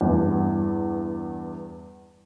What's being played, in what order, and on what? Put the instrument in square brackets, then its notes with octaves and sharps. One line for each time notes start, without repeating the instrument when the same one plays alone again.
[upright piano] E2 G2